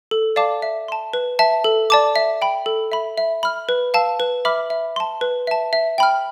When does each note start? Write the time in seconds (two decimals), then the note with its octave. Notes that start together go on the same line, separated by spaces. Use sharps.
0.11 A4
0.36 D5 F5 A5 D6
0.62 E5
0.88 A5 C6
1.13 B4
1.39 E5 A5
1.64 A4
1.90 D5 A5 D6
2.16 E5
2.42 G5 B5
2.66 A4
2.92 E5 B5
3.18 E5
3.43 B5 F6
3.69 B4
3.94 F5 A5 E6
4.20 B4
4.45 E5 B5 D6 F6
4.70 E5
4.96 A5 C6
5.21 B4
5.47 E5 A5
5.73 E5
5.98 G5 B5 F6